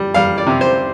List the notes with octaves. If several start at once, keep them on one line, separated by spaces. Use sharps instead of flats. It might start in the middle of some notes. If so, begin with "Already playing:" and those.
Already playing: G3
G3 F5
D5
C3
C5